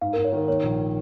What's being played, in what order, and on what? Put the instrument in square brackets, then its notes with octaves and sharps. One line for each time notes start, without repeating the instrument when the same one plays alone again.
[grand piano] G#2 [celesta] F5
[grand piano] G#2 [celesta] A#4
[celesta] C#5
[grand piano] D#3 [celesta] A#4
[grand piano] A#3 [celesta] C#5
[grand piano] A#1